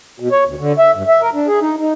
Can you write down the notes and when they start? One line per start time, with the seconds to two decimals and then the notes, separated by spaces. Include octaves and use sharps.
0.20 B2
0.32 C#5
0.45 D2
0.59 D3
0.78 E5
0.95 G2
1.08 E5
1.22 A#4
1.34 D4
1.47 G#4
1.61 D#4
1.78 D#4